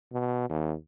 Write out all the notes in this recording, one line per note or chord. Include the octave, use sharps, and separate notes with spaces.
B2
D#2